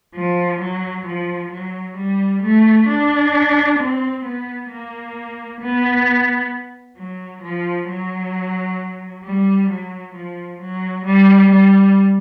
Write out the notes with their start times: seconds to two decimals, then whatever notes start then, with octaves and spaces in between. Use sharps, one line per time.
0.16 F3
0.61 F#3
1.07 F3
1.52 F#3
1.97 G3
2.43 A3
2.89 D4
3.79 C4
4.25 B3
4.70 A#3
5.61 B3
6.97 F#3
7.43 F3
7.88 F#3
9.24 G3
9.70 F#3
10.15 F3
10.61 F#3
11.06 G3
11.52 G3